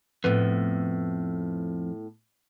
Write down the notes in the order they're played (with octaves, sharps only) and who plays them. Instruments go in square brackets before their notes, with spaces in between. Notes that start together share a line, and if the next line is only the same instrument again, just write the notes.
[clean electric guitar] F2 [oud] A2 B3